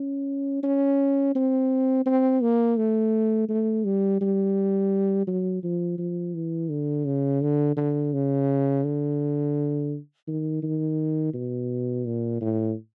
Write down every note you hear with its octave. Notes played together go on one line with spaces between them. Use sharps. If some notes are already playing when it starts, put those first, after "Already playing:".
Already playing: C#4
C#4
C4
C4
A#3
A3
A3
G3
G3
F#3
F3
F3
E3
D3
C#3
D3
D3
C#3
D3
D#3
D#3
B2
A#2
A2